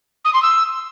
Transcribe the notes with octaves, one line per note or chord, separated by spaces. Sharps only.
D#6
C6
E6